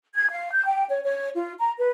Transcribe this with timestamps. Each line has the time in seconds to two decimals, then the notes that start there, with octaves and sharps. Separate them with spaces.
0.14 G#6
0.31 F5
0.53 G6
0.66 G5
0.89 C#5
1.02 C#5
1.34 F4
1.59 A#5
1.78 B4